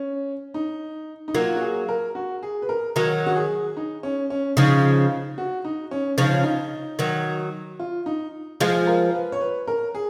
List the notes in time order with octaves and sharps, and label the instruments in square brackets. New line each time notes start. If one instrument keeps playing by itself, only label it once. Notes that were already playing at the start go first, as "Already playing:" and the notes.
Already playing: [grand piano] C#4
D#4
D#4
[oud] F#3 A#3 [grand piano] F4
[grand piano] F#4
G#4
A#4
F#4
G#4
B4
A#4
[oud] D#3 F#3 [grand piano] A#4
[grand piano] F#4
G#4
D#4
C#4
C#4
[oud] C#3 F3 [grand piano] D#4
[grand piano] F#4
D#4
C#4
[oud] C#3 F3 [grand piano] D#4
[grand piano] C#4
D#4
[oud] D#3 F#3
[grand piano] F4
D#4
[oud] F3 G#3 [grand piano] F4
[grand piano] A#4
B4
C#5
B4
A#4
G#4